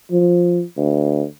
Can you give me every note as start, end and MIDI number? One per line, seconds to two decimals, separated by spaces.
0.12 0.62 53
0.77 1.24 38